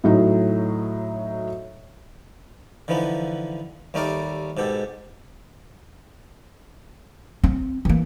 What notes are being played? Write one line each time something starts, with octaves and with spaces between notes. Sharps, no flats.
A2 F#3 D#4
D3 E3 F3 B3 D#4
D#2 G3 A3 D#4 A#4 D5
G#2 B2 G4 A4
C4
E3 A#3